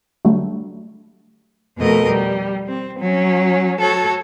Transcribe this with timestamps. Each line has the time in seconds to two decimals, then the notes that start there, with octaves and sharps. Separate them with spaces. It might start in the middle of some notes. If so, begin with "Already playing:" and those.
0.25 D3 F#3 G3 A3
1.77 F2 B2 A3 A#4 D#5
2.09 G3
2.67 C4
2.99 F#3 C#4
3.79 F#4 A4 C#5 A5